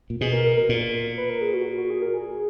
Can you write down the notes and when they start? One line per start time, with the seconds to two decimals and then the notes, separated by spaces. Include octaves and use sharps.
0.10 A#2
0.21 B2 G#4
0.33 A#4
0.45 A#4
0.57 A#4
0.69 A#2
1.17 B4
1.30 A#4
1.42 G#4
1.54 F#4
1.78 F#4
1.90 G#4
2.02 A#4
2.14 G#4